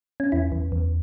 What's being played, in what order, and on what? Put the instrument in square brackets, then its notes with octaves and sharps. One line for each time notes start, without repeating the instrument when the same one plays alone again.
[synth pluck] C#4
E2 E4
E2
E2